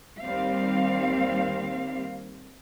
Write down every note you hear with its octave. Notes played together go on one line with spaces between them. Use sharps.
D#2 G3 C4 F5